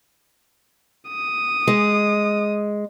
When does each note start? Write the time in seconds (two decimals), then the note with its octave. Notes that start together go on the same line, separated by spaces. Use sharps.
1.09 D#6
1.67 G#3